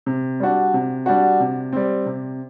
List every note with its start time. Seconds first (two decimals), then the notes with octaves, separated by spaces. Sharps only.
0.06 C3
0.40 G3 D4 F#4
0.74 C3
1.06 G3 D4 F#4
1.40 C3
1.72 G3 C4
2.06 C3